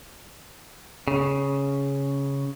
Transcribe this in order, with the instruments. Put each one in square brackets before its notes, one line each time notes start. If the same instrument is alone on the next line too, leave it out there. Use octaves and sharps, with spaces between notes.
[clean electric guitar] C#3